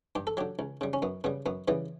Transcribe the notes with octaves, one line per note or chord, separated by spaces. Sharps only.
G2 G4
A4
D3 F#3 G4
C#2
C#3 G3
C#4
F#2 B3
C#3 G3 B3
F#2 B3
C#3 E3 G3 B3